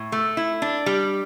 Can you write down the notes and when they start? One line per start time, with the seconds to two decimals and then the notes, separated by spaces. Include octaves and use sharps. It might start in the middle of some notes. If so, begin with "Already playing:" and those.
Already playing: A2
0.12 A3
0.37 E4
0.62 D4
0.86 G3